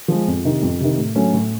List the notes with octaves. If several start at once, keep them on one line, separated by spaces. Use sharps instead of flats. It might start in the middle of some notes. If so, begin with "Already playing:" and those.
F3 G#3
F2
C3 D#3
F2
C3 D#3
A2
F#3 A3 C#4
A2